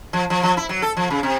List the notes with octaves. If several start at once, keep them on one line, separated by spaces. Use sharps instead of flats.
F3
F3
F3
E4
F#3
A4
F3
C#3
C3